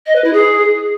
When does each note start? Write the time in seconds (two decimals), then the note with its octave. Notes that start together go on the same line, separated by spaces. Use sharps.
0.06 D#5
0.15 B4
0.24 E4
0.33 G#4